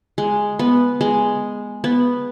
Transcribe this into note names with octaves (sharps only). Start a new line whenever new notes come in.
G#3
B3
G#3
B3